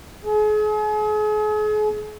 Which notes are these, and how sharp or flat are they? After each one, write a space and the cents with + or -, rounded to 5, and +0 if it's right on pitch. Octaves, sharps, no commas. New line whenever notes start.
G#4 +40